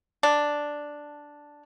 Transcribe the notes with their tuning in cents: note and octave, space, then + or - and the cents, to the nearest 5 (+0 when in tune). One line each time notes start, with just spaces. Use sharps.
D4 +0